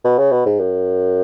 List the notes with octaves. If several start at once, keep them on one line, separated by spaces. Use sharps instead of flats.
B2
C#3
B2
G#2
F#2